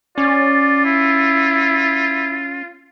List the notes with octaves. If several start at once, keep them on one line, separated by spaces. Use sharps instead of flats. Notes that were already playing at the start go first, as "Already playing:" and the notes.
C#4 F4 D5
E4